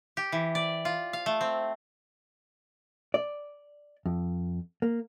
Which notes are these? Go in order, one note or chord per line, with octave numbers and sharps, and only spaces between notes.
G4
E3
D5
F4
F5
A3
C4
D5
F2
A#3